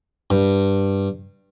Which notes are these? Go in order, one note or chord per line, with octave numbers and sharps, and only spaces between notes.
G2